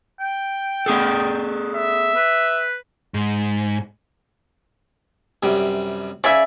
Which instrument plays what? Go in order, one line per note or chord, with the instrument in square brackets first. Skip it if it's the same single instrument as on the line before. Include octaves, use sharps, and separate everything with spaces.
[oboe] G5
[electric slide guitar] B3 G#4 A4
[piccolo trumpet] E5
[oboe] B4
[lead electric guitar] G#2
[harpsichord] F#2 C3 G3
[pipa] C#3 E5 [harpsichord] D5 G#5